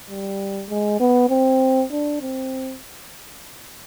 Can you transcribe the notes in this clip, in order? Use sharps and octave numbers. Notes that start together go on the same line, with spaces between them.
G3
G#3
B3
C4
D4
C4